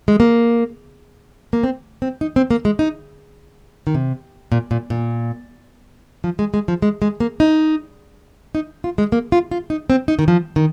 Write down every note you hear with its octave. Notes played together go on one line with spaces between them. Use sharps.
G#3
A#3
A#3
C4
C4
D#4
C4
A#3
G#3
D#4
D#3
C3
A#2
A#2
A#2
F3
G#3
G#3
F3
G#3
G#3
A#3
D#4
D#4
F4
G#3
A#3
F4
F4
D#4
C4
D#4
D#3
F3
D#3